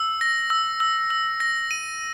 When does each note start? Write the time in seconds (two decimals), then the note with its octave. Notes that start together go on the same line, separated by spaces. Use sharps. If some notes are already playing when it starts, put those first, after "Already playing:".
Already playing: E6
0.21 A#6
0.50 E6
0.80 E6
1.10 E6
1.40 A#6
1.71 D#7